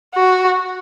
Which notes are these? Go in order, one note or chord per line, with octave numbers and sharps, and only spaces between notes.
F#4